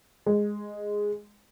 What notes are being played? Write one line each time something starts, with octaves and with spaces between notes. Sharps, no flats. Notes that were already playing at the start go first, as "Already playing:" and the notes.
G#3